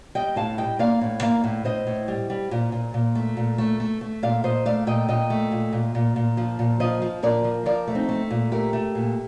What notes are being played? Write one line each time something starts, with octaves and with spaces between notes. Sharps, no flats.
G3 D#5 G5
A2 F5 A5
G3 D#5 G5
A#3 D5 F5
A2
A#3 D5 F5
A2
A2 C5 D#5
A2
G3
G3
A#2
A#2
A#2
A3
A#2
A3
A3
A3
A#2 D5 F5
A#2 C5 D#5
A3 D5 F5
A#2 D#5 G5
A#2 D#5 G5
A3
A#2
A#2
A#2
A#2
F3
A#2
F3 C5 D#5
F3
A#2 A#4 D5
F3
F3 A#4 D5
A3
C4 D#4
A3
A#2
A3 G4 A#4
A3
A#2